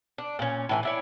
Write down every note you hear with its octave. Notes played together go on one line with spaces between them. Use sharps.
D4
A#2 C#4
A2 E3 G#5
D4 E4 C#5